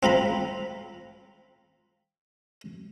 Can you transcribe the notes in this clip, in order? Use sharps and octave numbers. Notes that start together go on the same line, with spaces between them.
C4 F4 A#5 B5